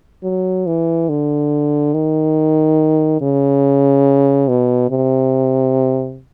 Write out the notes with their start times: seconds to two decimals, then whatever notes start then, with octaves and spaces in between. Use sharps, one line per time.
0.23 F#3
0.66 E3
1.09 D3
1.94 D#3
3.21 C#3
4.48 B2
4.90 C3